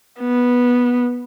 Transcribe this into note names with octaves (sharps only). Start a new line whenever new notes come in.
B3